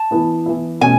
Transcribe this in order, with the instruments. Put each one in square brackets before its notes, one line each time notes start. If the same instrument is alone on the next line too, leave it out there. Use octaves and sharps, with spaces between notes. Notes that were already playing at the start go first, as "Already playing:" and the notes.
Already playing: [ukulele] A5
[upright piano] E3 B3 E4
E3 B3 E4
[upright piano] B2 A3 C#4 [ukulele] G#5